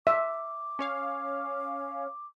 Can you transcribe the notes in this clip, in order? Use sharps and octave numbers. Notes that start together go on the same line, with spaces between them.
E5 D6
C#4 C#5 F5